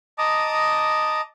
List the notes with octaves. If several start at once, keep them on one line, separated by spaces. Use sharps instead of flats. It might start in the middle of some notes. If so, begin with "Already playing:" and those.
D#5 A5 A#5 D6 D#6